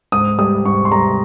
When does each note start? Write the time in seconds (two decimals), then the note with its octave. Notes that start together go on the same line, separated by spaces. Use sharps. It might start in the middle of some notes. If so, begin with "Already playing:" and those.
0.12 G#2 D#6
0.38 G3 D#6
0.65 G#2 C#6
0.85 C6
0.91 G3 A#5